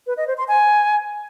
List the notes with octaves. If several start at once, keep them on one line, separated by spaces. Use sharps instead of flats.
B4
D#5
C5
C6
G#5